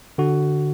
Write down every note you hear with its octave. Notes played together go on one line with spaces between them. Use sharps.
D3 F#4